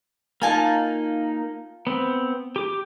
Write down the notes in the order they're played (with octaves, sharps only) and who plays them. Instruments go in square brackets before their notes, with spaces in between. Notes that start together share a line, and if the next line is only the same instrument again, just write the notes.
[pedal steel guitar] A#3 D#4 [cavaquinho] F4 G#5 A5
[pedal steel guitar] B3 C4
G4 D6